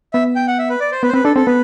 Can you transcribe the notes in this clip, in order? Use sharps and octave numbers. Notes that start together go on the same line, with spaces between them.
B3 E5
G5
F#5
E5
B4
D5
C5
B3 B4
C5
C4 B4
D4 A4
C4 A4
B3 B4